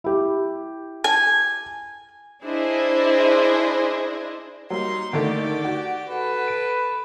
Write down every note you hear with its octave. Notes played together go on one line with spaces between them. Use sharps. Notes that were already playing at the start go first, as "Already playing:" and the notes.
E4 G4
G#5
D4 E4 G#4 C5 D5 D#5
F#3 G3 A#3 D#4 C6
D3 D#3 A3 G4 D5
F#4
A4 B4
D7